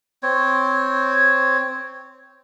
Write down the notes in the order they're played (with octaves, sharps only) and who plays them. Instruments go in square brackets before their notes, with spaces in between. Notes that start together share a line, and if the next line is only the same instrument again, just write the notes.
[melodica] C4 C#5